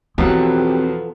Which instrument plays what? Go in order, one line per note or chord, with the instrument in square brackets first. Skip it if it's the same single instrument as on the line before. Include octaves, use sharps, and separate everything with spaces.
[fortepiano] E2 B2 F#3 [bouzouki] F3 B3 A4 [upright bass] C4 [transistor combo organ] G4